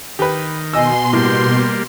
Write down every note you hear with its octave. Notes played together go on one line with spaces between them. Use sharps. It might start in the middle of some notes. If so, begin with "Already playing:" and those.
D#3 G4 B4
B2 D#5 G#5 C6 E6
A2 G3 A#3 G4